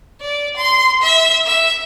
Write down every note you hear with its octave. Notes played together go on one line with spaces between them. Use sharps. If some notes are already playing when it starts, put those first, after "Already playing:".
D5
C6
E5
E5